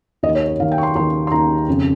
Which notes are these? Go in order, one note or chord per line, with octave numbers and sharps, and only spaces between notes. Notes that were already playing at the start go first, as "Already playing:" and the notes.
D#2 D#5
D#3
C#5
C#5
D#2 D#3 F5
G5
C#6
C6
D#2 D#3 C6
C6
D#2 D#3 A#5
F2 C#3